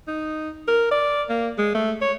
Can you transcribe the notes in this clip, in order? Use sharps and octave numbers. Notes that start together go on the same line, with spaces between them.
D#4
A#4
D5
A#3
G#3
A3
C#5